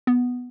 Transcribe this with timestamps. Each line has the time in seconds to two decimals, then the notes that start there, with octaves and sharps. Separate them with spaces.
0.07 B3